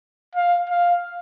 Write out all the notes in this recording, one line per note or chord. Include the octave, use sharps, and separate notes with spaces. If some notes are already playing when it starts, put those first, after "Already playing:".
F5
F5